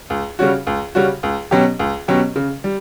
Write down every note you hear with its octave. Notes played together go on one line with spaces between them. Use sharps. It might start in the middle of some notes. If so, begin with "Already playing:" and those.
C#2
C#3 G3 C#4 F#4
C#2
C#3 G3 C#4 F#4
C#2
B2 F#3 C#4 G4
C#2
B2 F#3 C#4 G4
C#3
G3